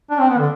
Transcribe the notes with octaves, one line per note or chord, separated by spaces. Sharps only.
D4
C4
B3
D3